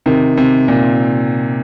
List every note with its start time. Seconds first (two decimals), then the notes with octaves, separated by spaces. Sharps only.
0.06 C3 D#3
0.37 C3
0.68 A#2